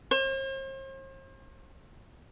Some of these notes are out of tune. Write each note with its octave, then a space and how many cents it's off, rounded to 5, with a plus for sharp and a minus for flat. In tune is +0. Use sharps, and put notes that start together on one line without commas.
C5 +45